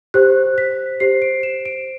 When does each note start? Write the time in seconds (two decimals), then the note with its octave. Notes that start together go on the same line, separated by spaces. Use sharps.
0.14 G4 C5 F#6
0.58 B6
1.00 G4 C5 C7
1.22 D7
1.43 E7
1.66 D7